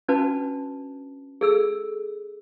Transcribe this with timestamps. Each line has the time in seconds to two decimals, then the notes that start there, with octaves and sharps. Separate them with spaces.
0.08 C#4 D4 F#4 B4 A5
1.41 G#4 A4 E6